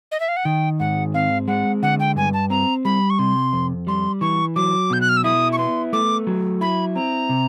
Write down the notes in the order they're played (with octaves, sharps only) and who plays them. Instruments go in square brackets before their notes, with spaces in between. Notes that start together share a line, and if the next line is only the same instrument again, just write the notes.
[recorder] D#5
E5
F5
F#5
[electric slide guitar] D#3 [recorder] G5
[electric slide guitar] G#2 [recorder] F#5
[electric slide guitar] C4 [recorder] F5
[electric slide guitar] G#3 [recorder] F#5
[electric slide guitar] D3 [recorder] F#5
[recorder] G5
[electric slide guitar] G2 [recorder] G#5
[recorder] A5
[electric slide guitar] C4 [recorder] A#5
[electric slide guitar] G3 [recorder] B5
[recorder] C#6
[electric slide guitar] C3 [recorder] C6
[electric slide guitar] F2
[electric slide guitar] G3 [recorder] C6
[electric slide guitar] E3 [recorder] C#6
[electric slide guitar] F#3 [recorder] D6
[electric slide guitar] B2 [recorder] G6
[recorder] F#6
F6
E6
[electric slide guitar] E4 [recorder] D#6
[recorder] C#6
[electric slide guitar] B3 [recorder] C6
[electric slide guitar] A3 [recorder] D6
[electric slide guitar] F#3
[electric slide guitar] E4 [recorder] B5
[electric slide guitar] C4 [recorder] A#5
[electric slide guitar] C3